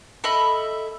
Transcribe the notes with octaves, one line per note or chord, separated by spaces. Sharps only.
A4 D#5 E5 B5